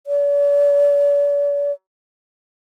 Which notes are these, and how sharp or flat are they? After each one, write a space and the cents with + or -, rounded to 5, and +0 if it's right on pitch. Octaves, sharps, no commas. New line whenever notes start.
D5 -45